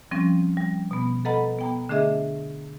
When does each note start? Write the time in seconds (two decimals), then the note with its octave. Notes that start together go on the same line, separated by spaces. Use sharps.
0.11 F3 G3 C4 C#4
0.57 G3
0.91 B2 B3
1.25 A4 B4 D#5 F#5 A#5 B5
1.59 B3 G5 A#5
1.89 D3 A3 D4 G#4 D#5 E5